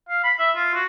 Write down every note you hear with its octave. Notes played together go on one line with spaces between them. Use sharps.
F5
B5
E5
F4
F#4